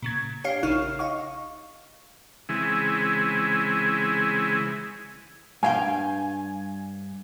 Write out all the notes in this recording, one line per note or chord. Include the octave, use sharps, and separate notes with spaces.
A#2 C#3 G#6
D4 G4 C#5 F5 C7
A#1 C#3 D#4 E4 C#6 F6
D#5 F5 C#6
C#3 E3 G#3 C4 E4 G#4
G2 F5 G5 G#5